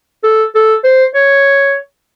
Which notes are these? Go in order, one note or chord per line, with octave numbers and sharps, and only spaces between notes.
A4
A4
C5
C#5